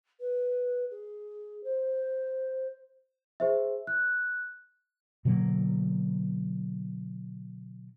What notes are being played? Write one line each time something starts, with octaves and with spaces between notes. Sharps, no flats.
B4
G#4
C5
G#4 C5 E5
F#6
B2 D3 F#3 A#3